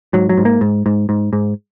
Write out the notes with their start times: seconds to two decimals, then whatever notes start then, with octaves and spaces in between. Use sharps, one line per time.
0.13 G#2 F#3
0.29 F#3
0.38 G#2
0.45 A#3
0.61 G#2
0.86 G#2
1.09 G#2
1.33 G#2